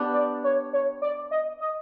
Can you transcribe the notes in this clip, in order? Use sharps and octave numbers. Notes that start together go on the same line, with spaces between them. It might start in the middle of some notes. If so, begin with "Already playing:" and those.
Already playing: B3 D4 G4
D5
C#5
C#5
D5
D#5
D#5